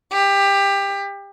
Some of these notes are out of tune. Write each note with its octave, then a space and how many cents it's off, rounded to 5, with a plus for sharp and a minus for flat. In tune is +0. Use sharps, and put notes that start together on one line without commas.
G4 +20